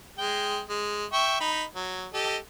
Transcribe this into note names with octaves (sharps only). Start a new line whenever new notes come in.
G#3 G5
G#3
E5 G5 C#6
D#4 B5
F#3
G4 A4 D#5